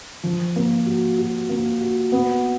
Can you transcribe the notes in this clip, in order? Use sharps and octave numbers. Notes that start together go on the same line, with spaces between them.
F3
A#3
F#4
F#4
A#3
F#4
B3